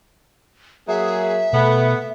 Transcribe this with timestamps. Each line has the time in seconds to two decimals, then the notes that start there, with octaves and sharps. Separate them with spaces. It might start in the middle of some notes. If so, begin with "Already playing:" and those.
0.88 F#3 A#3 G#4 E5
1.53 B2 A3 B3